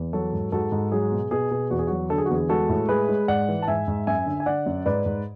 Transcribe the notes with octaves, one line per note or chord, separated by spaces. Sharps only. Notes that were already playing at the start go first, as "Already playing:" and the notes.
Already playing: E2
F#3 F#4 A4
G#2
G#2 F#4 A4
G#2
F#3 G#4
B2
B2 G#4
B2
E2 F#4
G#4
F#3 F#4
D3 A4
G#4
F#4
E2 G#4
G#3 F#4 A4
A2
G#3 G#4 B4
G#3
G#2 D5 F#5
E3
A5
G#2 E5 G#5
G#2
F#2 E5 G#5
D3
G#5
D3 D5 F#5
F#2
G#2 B4 D5
G#2